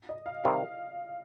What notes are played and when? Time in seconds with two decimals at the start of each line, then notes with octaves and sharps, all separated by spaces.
0.09 D#5
0.26 F5
0.44 C3 D#3 G3 F5